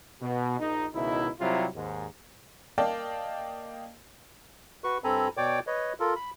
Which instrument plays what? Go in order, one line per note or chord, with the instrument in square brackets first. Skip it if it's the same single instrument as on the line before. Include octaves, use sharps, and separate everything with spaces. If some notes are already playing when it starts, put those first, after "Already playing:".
[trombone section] B2
A#1 D#4
C#2 B2 D#3 D#4 E4
C3 F#3 G3 C4 E4 F4
D#2 G#2
[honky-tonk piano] A#3 D5 D#5 F5 G5 A5
[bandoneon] F#4 B4 C#6
G2 C4 A4 G#5 A#5 B5
B2 C#5 D5 G5 D6
B4 C#5 D#5
F4 A4 A#4
B5